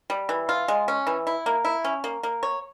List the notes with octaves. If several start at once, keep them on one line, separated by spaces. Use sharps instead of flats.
G3
E3
F4
G#3
C#4
E3
E4
A#3
E4
C#4
A#3
A#3
C#5